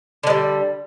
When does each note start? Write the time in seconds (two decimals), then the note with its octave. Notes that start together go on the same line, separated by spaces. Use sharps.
0.23 D3
0.27 G#3
0.30 G3